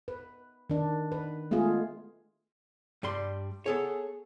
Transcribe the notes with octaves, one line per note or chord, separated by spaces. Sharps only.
B4
D#3 D4
B4
G#3 A3 B3 F4 G#4
G2 G3 C6
B3 G#4 A4 C#5